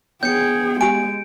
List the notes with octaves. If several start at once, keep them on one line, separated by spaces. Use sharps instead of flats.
B3 G#4 C#5 G5 G6 C#7
G#3 G4 G#5 D7